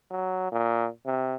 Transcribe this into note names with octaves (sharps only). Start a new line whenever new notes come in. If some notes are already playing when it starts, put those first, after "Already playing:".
F#3
A#2
C3